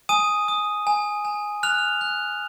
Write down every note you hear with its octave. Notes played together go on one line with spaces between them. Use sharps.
G#5 D#6 D#7
D#6
G#5
G#5
F6 F#6 F7
F#6